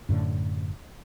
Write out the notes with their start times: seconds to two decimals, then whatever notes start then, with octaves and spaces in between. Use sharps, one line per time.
0.09 F#2 A2 D3